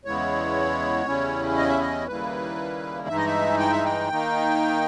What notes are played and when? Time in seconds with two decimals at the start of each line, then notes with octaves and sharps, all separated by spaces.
0.05 E2 C#3 G#3 B3 E4 C#5
1.06 E2 C#3 G3 C#4 E4
1.57 D#5
1.68 E5
1.80 D#5
2.07 D#2 C#3 G3 A#3 E4 B4
3.08 G2 E3 G#3 D#4 E5
3.17 D#5
3.25 E5
3.59 G5
3.72 E5
3.85 G5
4.09 D#3 A#3 D#4